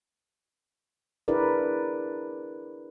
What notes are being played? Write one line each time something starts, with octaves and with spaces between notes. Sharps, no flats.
D4 E4 G#4 A#4 B4 D5